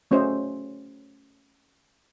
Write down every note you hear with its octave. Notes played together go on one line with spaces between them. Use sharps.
A3 C#4 F#4 C5 D#5 E5